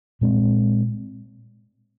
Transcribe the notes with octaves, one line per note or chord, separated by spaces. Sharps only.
A#2 G#3 C4